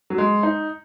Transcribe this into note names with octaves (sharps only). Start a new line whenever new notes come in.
F#3
G#3
D#4